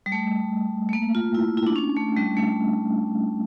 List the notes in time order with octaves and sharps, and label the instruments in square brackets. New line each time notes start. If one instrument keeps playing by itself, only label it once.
[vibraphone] G3
A3
A3
A#3
F4
E4
E4
D4
C#4
A3
G3
A3